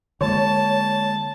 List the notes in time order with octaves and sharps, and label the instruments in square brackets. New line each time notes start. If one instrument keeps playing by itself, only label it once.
[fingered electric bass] D3 G#3 A#3 [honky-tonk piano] C#5 [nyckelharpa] A5